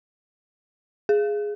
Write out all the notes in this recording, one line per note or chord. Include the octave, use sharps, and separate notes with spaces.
G#4